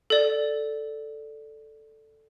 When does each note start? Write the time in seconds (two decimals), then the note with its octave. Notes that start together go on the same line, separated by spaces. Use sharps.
0.10 A4 D5